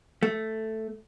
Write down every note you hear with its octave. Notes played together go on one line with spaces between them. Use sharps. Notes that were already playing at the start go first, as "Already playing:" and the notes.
A3